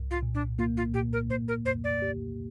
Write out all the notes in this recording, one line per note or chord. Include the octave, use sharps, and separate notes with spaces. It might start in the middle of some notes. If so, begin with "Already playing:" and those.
Already playing: C2
F4
A#2
D4
A#3 F4
F4
A#2 G4
A#4
A#3 C5
A#4
F2 C5
D5
G4